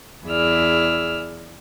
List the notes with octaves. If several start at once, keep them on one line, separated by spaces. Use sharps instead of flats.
E2 E4 G#4 D5 E6 F6